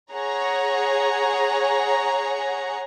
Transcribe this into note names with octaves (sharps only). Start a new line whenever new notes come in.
G#4 C#5 F#5 A#5